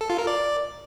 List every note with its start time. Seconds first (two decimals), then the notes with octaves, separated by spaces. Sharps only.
0.01 A4
0.10 F4
0.18 A#4
0.27 D5